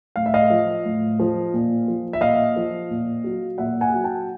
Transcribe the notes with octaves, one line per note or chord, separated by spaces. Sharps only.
A2 F5
E5
D#5 F5
F3
A2
F3
A#2
F3
E5
A#2 D#5 F5
F3
A#2
F#3
A#2 E5 F#5
F#5 G#5
F#3
G5 A5